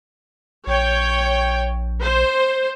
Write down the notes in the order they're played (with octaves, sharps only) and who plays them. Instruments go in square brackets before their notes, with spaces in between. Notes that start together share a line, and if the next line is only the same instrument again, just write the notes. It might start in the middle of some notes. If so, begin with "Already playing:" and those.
[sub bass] A#1 [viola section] C#5 G5
[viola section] C5